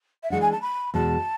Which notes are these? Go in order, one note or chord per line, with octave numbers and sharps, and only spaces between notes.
E5
E3 G#3 D4 F#5
G#5
A5
B5
E2 B2 G#3 A5